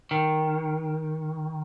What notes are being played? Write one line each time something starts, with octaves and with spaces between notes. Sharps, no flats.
D#3